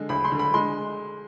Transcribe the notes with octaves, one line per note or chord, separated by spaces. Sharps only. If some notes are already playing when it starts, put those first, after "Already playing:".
Already playing: D3 G#3
D2 B5
C6
D3
B5
G#3 C6